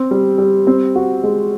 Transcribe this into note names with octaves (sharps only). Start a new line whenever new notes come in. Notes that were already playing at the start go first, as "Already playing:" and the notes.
Already playing: C4
G3
G3
C4
F#4
G#3